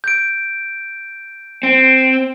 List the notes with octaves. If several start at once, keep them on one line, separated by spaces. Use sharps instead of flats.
G6 D7
C4